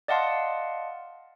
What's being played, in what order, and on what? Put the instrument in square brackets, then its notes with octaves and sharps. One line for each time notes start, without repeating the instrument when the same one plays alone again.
[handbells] D5 D#5 F5 F#5 A5 C6